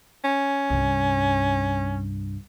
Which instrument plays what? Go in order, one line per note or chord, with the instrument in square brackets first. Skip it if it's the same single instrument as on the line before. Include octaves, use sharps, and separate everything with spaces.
[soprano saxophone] C#4
[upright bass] C2 G2